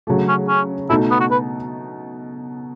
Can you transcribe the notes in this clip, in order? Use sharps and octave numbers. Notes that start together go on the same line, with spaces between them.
C#3 F#3 A3
C#4
C#4
B2 A3 D#4 E4
B3
F#4
B4